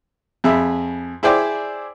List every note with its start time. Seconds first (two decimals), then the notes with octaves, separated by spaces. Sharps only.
0.44 F2 G#4 E5 B5
1.23 E4 G#4 C5 D5 G5 D6